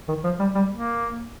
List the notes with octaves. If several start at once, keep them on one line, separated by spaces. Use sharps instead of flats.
D#3
F3
G3
G3
A#3